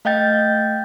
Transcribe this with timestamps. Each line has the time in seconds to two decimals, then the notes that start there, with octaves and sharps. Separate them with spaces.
0.05 A3 D#5 F5 G5 G6 A6